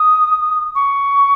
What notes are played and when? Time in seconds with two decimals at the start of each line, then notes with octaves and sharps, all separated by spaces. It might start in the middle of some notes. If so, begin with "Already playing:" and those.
Already playing: D#6
0.75 C#6